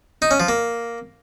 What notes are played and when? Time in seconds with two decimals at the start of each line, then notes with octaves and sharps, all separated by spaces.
0.22 D#4
0.31 C#4
0.40 F3
0.49 A#3